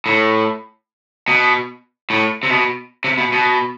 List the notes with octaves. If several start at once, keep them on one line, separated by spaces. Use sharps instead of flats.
A2
B2
A2
C3
B2
C3
B2
B2